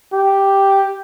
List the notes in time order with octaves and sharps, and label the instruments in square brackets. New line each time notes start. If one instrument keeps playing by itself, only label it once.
[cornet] G4